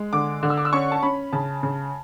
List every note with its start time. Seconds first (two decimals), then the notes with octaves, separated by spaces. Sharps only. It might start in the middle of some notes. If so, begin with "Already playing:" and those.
Already playing: G#3
0.13 D3 D6
0.43 D3
0.50 E6
0.57 D6
0.65 E6
0.73 C#4 C#6
0.92 A5
1.03 C#4 B5
1.33 C#3 A5
1.63 C#3